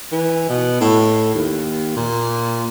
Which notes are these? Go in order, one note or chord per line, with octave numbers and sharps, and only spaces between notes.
E3
B2
A2
D#2
A#2